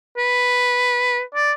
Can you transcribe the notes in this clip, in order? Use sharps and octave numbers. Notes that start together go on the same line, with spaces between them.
B4
D5